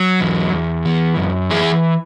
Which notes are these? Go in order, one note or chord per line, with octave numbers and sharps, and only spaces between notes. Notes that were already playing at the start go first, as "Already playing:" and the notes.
Already playing: F#3
E2
E2
E3
F#2
E3 E4 G#4